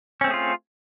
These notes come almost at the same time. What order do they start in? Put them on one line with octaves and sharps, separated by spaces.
C#4 C4 A3 G#4 F4